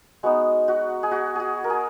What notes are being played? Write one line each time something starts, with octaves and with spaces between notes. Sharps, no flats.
G#3 B3 D#4 F#4
F#4
G#4
F#4
F#4 G#4
A#4
G#4